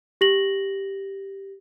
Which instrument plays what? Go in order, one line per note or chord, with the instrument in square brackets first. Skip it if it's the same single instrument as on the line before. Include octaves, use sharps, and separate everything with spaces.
[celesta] G4 A#6 F#7